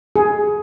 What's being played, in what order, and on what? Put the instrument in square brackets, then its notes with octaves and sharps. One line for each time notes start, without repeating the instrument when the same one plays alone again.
[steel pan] G#4